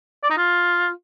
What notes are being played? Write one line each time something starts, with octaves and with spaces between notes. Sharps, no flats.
D5
D#4
F4